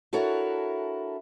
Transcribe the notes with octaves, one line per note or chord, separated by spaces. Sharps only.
D4 E4 F#4 A4 A#4 C#5